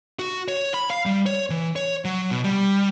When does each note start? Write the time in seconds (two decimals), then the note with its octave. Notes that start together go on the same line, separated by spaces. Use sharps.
0.19 F#4
0.48 C#5
0.74 B5
0.90 F5
1.06 G3
1.26 C#5
1.50 E3
1.76 C#5
2.05 F#3
2.31 B2
2.44 G3